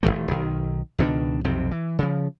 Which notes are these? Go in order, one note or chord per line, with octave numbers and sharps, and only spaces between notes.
D#1 F2 E3 A3
B1 D#3
C#2 B2 D#3 D4
B1 F2 C3 C4
E3
C#3 F3